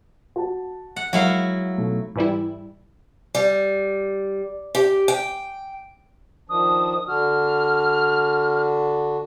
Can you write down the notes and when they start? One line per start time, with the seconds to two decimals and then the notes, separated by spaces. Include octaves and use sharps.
0.36 F#4 A5
0.96 F#5
1.13 F#3 G#3 E4 A#4 F5 F#5
1.78 B1 A3
2.16 G#2 E3 G3 E4
3.35 G3
4.75 G4
5.08 G5
6.49 D#3 F3 D4 D#6
7.08 D3 D4 F#4 F6